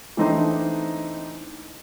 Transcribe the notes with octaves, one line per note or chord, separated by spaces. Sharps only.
E3 A3 C4 D4 D#4 C5